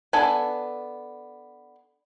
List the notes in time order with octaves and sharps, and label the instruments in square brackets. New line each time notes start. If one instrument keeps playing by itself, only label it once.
[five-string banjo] B3 D4 A4 G#5